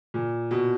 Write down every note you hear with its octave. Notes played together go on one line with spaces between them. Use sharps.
A#2
B2